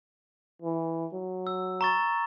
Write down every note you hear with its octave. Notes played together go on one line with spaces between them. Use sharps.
E3
F#3
E6
A#5 C#6 A6